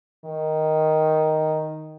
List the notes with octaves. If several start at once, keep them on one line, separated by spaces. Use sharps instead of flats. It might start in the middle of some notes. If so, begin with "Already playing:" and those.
D#3